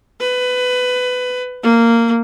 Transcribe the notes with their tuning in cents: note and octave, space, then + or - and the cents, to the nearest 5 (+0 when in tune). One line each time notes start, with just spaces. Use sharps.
B4 +20
A#3 -15